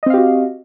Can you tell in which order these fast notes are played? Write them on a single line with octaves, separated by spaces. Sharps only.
D#5 C4 F5 G4 F#4